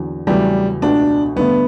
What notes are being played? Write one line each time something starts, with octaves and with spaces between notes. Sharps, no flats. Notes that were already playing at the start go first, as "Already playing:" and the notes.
Already playing: E2 D3 F#3
E2 C#3 F#3 G3 A3
C#2 B2 A3 D4
G2 D3 A3 B3